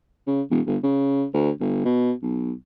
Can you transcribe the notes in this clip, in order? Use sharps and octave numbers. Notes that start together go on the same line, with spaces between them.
C#3
E1
G1
C#3
D2
G1
B2
B1